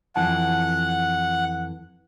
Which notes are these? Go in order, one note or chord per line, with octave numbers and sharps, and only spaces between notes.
F2 E3 F#5 A5